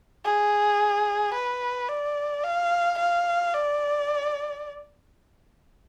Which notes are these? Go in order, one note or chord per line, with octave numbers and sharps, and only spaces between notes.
G#4
B4
D5
F5
F5
D5